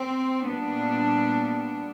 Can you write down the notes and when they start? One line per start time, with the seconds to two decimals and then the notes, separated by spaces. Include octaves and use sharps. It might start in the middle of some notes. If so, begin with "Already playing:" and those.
Already playing: C4
0.43 A#2 G3 B3 D4